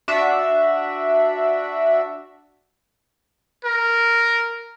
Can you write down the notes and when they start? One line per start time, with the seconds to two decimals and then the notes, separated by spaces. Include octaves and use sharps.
0.08 D4 F#4 E5
3.64 A#4